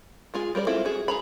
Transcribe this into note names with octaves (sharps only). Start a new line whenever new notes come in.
G#3 F4 G#4
G3 A#4 C#5 D5
G#3 C4 E4 F4 A4
F#4 G#4
G#4 A#5 B5